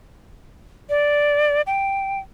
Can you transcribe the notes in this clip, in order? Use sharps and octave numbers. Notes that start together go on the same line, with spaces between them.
D5
G5